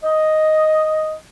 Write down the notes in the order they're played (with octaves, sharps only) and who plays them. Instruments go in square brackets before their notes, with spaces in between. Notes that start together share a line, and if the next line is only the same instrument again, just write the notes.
[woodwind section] D#5